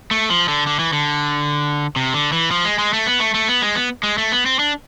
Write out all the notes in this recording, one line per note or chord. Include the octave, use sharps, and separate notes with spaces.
A3
F3
D3
D3
E3
D3
C3
D3
E3
F3
G#3
G#3
A3
B3
A3
A3
B3
G#3
B3
G#3
A3
B3
C4
D4